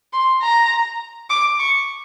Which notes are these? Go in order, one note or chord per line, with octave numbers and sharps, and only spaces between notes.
C6
A#5
D6
C#6